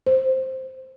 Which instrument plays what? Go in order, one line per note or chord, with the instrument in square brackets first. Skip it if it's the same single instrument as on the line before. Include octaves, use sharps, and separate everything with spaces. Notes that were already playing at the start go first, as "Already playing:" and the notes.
[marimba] C5